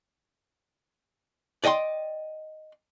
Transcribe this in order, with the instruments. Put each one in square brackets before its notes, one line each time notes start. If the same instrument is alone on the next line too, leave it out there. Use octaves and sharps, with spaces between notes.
[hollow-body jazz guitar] D5 D#5 G5 G#5 C6